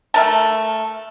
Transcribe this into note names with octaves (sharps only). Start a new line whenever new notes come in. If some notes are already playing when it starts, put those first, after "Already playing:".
A3 A#4 A5